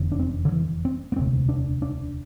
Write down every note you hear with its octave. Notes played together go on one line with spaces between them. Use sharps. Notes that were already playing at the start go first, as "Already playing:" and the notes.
Already playing: F1 E2 D3
D4
C4
D3
E3
C4
B3
E1 D2 C3 C4
D4
D4